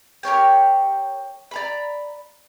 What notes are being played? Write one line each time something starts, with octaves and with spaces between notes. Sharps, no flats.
G4 A#4 C#5 G5
D5 A#5 B5